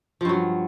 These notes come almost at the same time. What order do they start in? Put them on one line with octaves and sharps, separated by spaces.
F3 G2 F#3